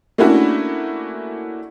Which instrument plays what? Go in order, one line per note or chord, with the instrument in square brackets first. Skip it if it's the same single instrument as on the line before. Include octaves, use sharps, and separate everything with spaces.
[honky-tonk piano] A3 A#3 C#4 D4 E4 F#4